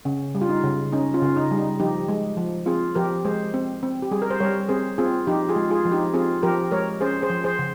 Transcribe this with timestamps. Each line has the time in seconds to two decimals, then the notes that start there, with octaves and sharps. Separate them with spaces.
0.05 C#3 C#4
0.35 G3
0.41 F4
0.49 D#4
0.64 C#3
0.92 C#4 D#4
1.14 C#4 F4
1.22 C#3
1.36 D#4
1.51 G3
1.57 D#4
1.80 F3 D#4 G4
2.08 G#3
2.37 F3
2.66 C4 F4 G#4
2.95 F3 G4 A#4
3.25 G#3 G#4 C5
3.54 C4
3.83 C4
4.02 G4
4.11 G3 G#4
4.22 A#4
4.30 C5
4.40 G3 A#4 C#5
4.69 C4 G#4 C5
4.98 C4 F4 G#4
5.27 F3 D#4 G4
5.49 F4 G#4
5.56 G#3
5.71 F4 G#4
5.85 F3
5.92 D#4 G4
6.14 C4 F4 G#4
6.43 F3 G4 A#4
6.71 G#3 A#4 C#5
7.01 C#4 G#4 C5
7.22 G#4 C5
7.30 F3
7.44 G#4 C5
7.59 C#3